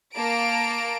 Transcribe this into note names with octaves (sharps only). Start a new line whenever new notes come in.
A#3 A5 A#5 D7